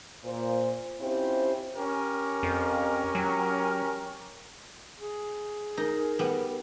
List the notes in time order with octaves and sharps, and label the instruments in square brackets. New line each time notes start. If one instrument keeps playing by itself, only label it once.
[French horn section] A#2 C5
C4 C#4 E4 F4 G4 C5
[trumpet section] C#4 G4 A#4
[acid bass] F2
F#3
[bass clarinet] G#4
[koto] D#4 [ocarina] A#4
[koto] G3 B3